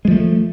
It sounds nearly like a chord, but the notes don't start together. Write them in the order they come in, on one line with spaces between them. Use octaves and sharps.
G#3 F3 A3